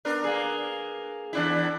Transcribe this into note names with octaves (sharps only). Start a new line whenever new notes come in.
B3 D4 A#4
A#3 G#4
E2 D4 E4